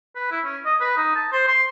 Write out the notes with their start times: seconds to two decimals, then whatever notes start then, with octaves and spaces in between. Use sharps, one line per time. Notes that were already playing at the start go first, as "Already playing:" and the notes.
0.16 B4
0.31 E4
0.45 C#4
0.65 D#5
0.81 B4
0.97 D#4
1.15 A5
1.32 C5
1.48 C6